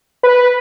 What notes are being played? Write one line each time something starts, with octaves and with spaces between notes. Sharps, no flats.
B4